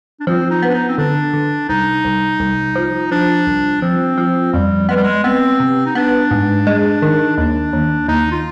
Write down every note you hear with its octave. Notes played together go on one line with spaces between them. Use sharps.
D4
F3 C4
D#4
B3
D4
D#4
C4
D3 D4
D3
C2 D#4
C2
C2
F3
F3 D4
C2
F3 C4
F3
F2 G3
G#3 B3
G3
G#3
B3 C4
C3
D#4
B3 D4
G#2
G#3
D#3
D#2 D4
D#2
D#2 D#4
F4